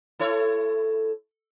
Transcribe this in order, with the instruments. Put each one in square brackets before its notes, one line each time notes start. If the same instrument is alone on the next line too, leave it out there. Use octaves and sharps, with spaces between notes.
[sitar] E4 A4 C#5